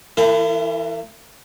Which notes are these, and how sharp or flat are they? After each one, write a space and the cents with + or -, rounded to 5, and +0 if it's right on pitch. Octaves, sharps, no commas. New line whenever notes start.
E3 +0 E4 +45 A#4 -45